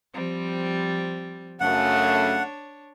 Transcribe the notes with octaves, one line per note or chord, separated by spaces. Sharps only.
F3 G3 C4
F#2 C#3 A3 D4 C#5 F#5